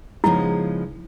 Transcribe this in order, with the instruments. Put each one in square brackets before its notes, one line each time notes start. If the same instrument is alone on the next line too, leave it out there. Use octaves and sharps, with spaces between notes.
[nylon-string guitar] C#3 F3 G#3 B3 D#4 [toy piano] E4